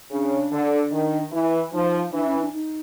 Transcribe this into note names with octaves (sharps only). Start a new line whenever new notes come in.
C#3 D4
D3
D#3
E3
F3 D#4
E3 D4
C#4
D4
D#4